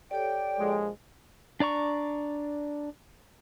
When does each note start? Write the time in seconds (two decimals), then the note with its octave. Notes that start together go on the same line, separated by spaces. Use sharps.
0.11 G4 A4 C#5 D5 G5
0.59 A#1 F3 G#3
1.60 D4 D5 A#5 C#6